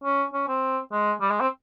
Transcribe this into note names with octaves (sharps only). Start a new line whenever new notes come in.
C#4
C#4
C4
G#3
G3
G#3
C4